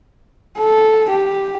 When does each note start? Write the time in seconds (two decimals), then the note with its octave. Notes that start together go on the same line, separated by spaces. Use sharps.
0.58 A4
1.10 G4